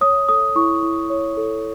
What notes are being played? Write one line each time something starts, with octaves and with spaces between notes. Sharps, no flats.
C#5 D#6
A4 D#6
E4 C#6
E4
C#5
A4